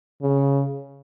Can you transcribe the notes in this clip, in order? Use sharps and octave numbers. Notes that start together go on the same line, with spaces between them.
C#3